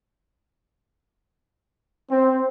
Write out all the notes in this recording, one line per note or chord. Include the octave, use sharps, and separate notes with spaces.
C4